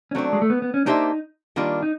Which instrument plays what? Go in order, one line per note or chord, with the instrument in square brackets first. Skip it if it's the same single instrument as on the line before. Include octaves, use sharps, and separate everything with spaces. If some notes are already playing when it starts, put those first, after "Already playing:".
[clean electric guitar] C#4
[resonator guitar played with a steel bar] F#3 A3 D4 [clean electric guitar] C4
[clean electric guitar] G#3
A3
B3
B3
C#4
[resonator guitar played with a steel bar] A#3 D4 G4 C5 E5 [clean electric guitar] D#4
[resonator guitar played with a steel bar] D#3 G3 A#3 D4 F4
[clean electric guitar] D#4